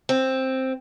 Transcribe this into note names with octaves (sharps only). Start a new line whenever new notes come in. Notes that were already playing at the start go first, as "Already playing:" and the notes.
C4